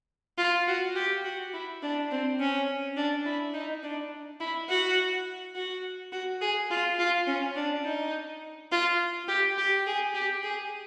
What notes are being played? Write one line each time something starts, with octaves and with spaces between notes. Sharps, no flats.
F4
F#4
G4
F#4
E4
D4
C4
C#4
D4
E4
D#4
D4
E4
F#4
F#4
F#4
G#4
F4
F4
C#4
D4
D#4
F4
G4
G4
G#4
G4
G#4